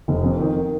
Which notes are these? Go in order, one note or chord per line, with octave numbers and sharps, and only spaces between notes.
F1
F2
D#3